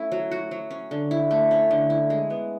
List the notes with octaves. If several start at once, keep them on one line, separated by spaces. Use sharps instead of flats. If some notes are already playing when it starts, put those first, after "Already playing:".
Already playing: A3 C#4 E4
F#3
F#4
F#3
C#4
D3
E4
A3
C#4
D3
E4
G#3
B3